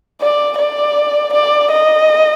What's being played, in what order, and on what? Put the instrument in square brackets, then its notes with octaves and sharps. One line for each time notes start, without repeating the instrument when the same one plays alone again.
[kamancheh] D5
D5
D5
D#5